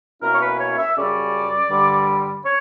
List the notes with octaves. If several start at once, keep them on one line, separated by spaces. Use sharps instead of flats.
B2 A#3 C#4 E4 A#4
C#5
B4
C#5
E5
F#2 C#3 G3 C#4 D5
G2 D3 G3
C#5